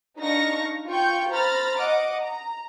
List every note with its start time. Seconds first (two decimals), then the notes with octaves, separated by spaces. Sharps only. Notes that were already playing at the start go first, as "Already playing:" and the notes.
0.18 D4 D#4 F5 C#6 A#6
0.87 F4 F5 G5 C#6 G6
1.29 C5 A#5 B5 F6 A6
1.79 D#5 F#5 D6
2.22 A#5